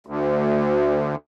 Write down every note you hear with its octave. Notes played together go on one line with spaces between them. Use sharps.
D2